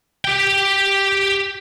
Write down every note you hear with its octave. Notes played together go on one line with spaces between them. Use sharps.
G4 G5